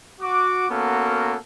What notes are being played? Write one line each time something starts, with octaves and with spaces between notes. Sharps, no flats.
F#4 D6
A#3 B3 C#4 F#4 A4 A#4